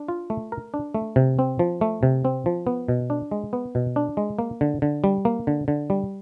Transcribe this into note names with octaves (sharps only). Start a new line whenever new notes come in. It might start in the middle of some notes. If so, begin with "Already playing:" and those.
Already playing: D4
F4
A3
A#4
D4
A3
C3
C4
F3
A3
C3
C4
F3
B3
B2
D4
G#3
B3
B2
D4
G#3
A#3
D3
D3
G3
A#3
D3
D3
G3